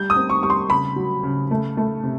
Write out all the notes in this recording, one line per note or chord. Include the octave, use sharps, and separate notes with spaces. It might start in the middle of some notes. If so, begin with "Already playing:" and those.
Already playing: G3 G6
D#6
C4
C#6
G3 C#6
C6
C#3 B5
F#3
C#3
A3
A3
C3